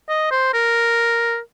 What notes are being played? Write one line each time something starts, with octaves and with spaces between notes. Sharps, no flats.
D#5
C5
A#4